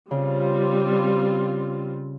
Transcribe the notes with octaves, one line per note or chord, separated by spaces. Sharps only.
C#3 G3 C4 F4